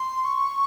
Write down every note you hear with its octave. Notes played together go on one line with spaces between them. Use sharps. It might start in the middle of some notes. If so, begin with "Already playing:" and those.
Already playing: C6
C#6